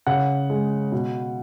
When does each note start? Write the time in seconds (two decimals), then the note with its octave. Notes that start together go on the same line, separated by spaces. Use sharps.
0.07 C#3 F#5
0.50 G#3
0.92 B2